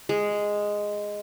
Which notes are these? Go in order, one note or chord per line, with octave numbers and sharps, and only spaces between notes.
G#3